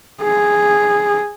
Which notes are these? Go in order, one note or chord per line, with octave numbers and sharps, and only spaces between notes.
G#4